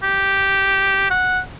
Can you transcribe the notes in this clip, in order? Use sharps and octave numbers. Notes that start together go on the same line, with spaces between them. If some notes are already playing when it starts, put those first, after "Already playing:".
G4
F#5